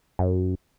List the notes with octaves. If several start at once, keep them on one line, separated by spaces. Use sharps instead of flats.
F#2